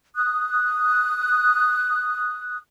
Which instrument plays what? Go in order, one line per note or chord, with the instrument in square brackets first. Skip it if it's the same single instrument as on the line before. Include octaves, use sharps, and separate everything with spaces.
[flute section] D#6 F#6